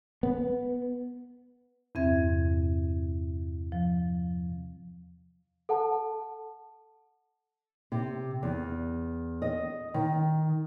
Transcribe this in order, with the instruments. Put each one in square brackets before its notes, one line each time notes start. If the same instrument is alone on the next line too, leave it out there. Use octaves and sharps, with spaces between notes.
[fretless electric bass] B3
[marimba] E2 G2 C3 C4 E5 G#6
F3
[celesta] A4 F#5 A5
[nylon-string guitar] C3
E2
D#5
D#3